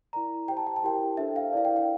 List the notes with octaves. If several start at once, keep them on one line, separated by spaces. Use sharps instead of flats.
E4 A#4 D5 A#5
G4 C5 G5
A5
G5
A5
E4 G4 A#4 G5
D4 A4 C5 E5
F5
E4 A#4 D5 F5
G5
G5